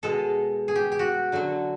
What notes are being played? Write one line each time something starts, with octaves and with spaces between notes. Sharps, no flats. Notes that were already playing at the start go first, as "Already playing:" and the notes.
B2 G#3 A4
G#4
G4
G4
F#4
D3 F#3 A3